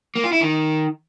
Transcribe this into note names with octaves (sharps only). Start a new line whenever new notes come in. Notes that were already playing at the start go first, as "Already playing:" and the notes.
A#3
F4
E4
D#3